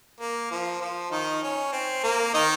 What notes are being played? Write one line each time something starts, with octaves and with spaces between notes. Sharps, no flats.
A#3
F3
F3
D#3 D#4
C#4
C4
A#3
D#3 D#4